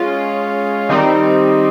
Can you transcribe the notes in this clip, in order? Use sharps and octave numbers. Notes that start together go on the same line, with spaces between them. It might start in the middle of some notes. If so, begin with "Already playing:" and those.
Already playing: G#3 C#4 F4
D#3 G3 C4 D#4